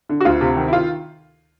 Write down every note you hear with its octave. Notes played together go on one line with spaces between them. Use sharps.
D3
F#4
D2 F4
C3
D#3
E4
F4